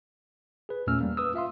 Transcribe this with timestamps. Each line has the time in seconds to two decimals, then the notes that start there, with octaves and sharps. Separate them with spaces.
0.69 G#4 B4
0.87 E2 A#2 A3 C#4 E6 F6
1.00 G3 A#3
1.17 B4 D#6 E6
1.34 F4 E5 F5 C6